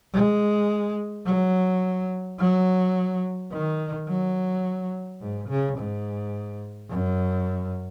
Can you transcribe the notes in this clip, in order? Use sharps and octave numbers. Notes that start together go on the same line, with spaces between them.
G#3
F#3
F#3
D#3
F#3
G#2
C#3
G#2
F#2